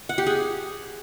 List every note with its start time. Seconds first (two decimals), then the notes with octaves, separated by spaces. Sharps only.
0.09 F#5
0.18 G4
0.27 G#4